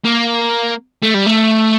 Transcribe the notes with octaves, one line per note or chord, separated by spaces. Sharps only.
A#3
A3
G3
A3